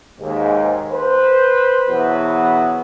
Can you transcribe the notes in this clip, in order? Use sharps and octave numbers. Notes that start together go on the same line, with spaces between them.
D#2 G#2
B4 C5
E2 B2 F#3 B3